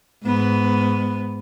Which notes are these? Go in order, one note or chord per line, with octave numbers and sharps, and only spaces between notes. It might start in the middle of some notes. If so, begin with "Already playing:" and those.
G#2 B3